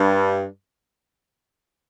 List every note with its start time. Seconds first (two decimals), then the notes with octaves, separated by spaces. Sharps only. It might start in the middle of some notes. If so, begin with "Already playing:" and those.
Already playing: G2